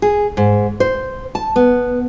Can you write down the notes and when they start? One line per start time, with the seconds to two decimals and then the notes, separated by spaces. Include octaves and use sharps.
0.02 G#4
0.37 G#2
0.80 C5
1.35 A5
1.56 B3